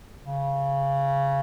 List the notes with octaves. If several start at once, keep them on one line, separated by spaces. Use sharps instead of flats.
C#3